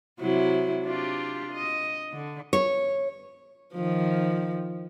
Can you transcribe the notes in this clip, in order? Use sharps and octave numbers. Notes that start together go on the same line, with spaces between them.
C3 F#3 E4
D4 F4 G4
D#5
D3
C#5
D#3 F3